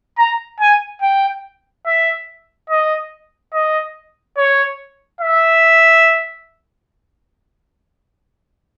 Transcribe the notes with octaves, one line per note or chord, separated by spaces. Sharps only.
A#5
G#5
G5
E5
D#5
D#5
C#5
E5